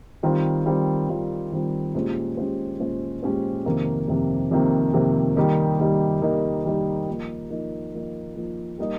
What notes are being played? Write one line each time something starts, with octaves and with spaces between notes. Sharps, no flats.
D#3 G3 C4 F4
D#3 G3 C4 F4
D#3 G3 C4 F4
D#3 G3 C4 F4
A#2 G#3 C#4 G4 C5
A#2 G#3 C#4 G4 C5
A#2 G#3 C#4 G4 C5
A#2 G#3 C#4 G4 C5
F2 C3 D#3 A#3
F2 C3 D#3 A#3
F2 C3 D#3 A#3
F2 C3 D#3 A#3
D#3 G3 A#3 D#4 G4
D#3 G3 A#3 D#4 G4
D#3 G3 A#3 D#4 G4
D#3 G3 A#3 D#4 G4
F3 A#3 D#4
F3 A#3 D#4
F3 A#3 D#4
F3 A#3 D#4
G3 A#3 D#4 A#4 D#5